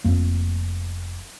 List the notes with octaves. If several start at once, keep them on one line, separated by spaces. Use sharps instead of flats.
F1 F2 A#3